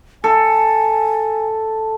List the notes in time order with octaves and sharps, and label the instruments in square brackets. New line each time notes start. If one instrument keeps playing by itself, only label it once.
[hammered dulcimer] A4 [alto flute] G#5